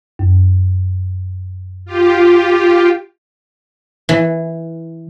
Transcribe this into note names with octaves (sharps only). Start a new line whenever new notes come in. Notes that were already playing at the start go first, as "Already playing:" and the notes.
F#2
F4 G4
E3